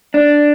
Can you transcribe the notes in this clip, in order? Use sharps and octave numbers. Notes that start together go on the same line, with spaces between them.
D4